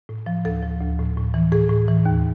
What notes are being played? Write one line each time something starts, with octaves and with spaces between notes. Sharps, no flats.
A2
F3
D2 A4
F3
D2
A2
A2
E3
A2 G#4
A2
E3
D#2